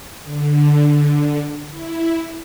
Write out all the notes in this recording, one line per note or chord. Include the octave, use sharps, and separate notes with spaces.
D3
E4